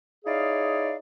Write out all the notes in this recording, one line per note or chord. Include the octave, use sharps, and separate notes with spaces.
D#4 E4 G#4 C#5 D5 F5